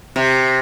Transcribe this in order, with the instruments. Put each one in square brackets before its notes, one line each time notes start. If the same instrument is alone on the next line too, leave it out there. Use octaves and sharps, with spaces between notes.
[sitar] C3